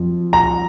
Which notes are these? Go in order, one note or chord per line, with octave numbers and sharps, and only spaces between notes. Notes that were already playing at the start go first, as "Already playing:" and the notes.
Already playing: F2 F3
A#5